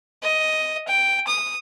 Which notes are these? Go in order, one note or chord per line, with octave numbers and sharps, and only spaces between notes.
D#5
G5
D#6